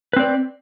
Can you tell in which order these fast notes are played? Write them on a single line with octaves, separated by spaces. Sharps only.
B4 C4 D5